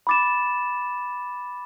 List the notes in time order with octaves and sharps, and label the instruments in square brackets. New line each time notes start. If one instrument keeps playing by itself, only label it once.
[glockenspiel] B5 D6 A6 E7